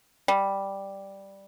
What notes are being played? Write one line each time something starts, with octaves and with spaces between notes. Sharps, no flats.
G3